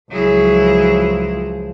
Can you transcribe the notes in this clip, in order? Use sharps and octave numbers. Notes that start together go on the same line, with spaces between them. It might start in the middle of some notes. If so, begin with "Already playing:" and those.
C#2 F3 F#3 E4 G#4